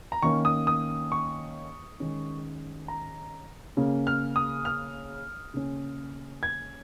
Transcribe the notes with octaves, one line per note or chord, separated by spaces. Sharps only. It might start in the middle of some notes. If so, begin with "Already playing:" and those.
A#5
D#3 A#3 C#4 C#6
D#6
D#6
C#6
D#3 G#3 C#4
A#5
C#3 A#3 C#4
F6
D#6
F6
C#3 A#3 C#4
G#6